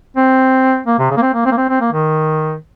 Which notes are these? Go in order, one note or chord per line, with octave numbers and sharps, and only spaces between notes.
C4
A#3
C3
C#3
A#3
C4
A#3
C4
A#3
C4
C4
A#3
D#3